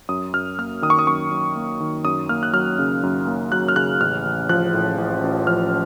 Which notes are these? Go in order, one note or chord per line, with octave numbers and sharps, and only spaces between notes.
F#2 D#6
F#2 F6
A#3 F6
D#3 D#6
C#6
D#6
F#2 C#6
F#2
A#3
D#3
F#2 D#6
A#3 F6
F#6
F#3 F6
C#3
F#2
A#3
F#3 F#6
F6
C#3 F#6
A1 F6
A1
F3 F#6
A2
A1
A1
F3 F6